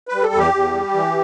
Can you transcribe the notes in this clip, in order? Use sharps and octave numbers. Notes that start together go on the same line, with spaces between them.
G3 B4
A4
E2
G4
E2
G3
E3